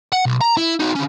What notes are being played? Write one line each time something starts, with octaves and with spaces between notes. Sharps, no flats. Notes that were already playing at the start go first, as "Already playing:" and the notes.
F#5
B1
A#5
E4
D#4 F#4
D3 C#4